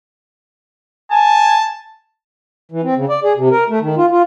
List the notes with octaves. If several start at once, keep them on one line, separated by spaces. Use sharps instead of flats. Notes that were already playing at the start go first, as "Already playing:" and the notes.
G#5 A5
E3
C4
C#3
D5
G#4
C3
A#4
A3
D#3
F4
F4